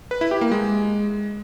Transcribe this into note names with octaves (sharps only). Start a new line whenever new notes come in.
B4
E4
G4
A#3
G#3